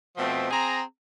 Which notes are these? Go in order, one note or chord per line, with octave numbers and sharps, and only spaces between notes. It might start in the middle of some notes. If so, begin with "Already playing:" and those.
B2 F3 A3 C4
C4 G#4 A#5